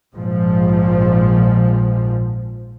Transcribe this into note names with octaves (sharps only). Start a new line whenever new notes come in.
A#1 G#2 F3